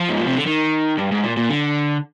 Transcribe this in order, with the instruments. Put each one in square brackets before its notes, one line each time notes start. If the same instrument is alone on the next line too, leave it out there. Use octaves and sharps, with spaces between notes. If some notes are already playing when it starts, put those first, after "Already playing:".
Already playing: [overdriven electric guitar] F3
G#2
A#2
C3
D3
D#3
G2
G#2
A#2
A#2
D3